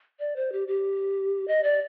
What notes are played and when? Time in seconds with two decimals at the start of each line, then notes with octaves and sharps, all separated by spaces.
0.19 D5
0.36 C5
0.52 G4
0.68 G4
1.48 D#5
1.63 D5